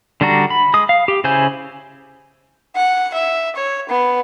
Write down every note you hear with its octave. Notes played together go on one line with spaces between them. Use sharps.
D3 G3 D4 F#4 A#5
B5
G#3 D#6
F5
G4
C#3 E4 C5 G#5 G6
F#5
E5
C#5
B3